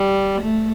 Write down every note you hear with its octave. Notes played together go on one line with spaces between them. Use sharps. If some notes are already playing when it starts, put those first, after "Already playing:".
Already playing: G3
A3